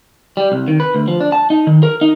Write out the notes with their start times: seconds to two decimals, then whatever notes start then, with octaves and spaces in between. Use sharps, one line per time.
0.37 G3
0.52 C2
0.68 D#3
0.80 B4
0.95 D2
1.08 F3
1.21 D4
1.32 A5
1.50 D#4
1.67 D#3
1.83 A#4
2.01 D#4